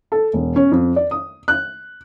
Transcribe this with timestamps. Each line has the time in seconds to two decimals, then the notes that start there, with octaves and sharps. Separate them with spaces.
0.12 A4
0.33 E1
0.56 C#4
0.71 F2
0.96 D5
1.11 D#6
1.48 F#6